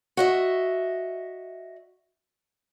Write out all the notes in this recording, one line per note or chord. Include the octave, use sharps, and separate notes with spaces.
F#4 D#5 E5